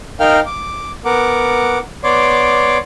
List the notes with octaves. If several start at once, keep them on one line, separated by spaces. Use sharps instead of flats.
D#4 A#4 F5 G5 F6
D6
B3 A#4 F#5 D6
B3 C#5 D5 C6 D6